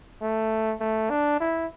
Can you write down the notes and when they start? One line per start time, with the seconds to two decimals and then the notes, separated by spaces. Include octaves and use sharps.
0.22 A3
0.80 A3
1.10 D4
1.40 E4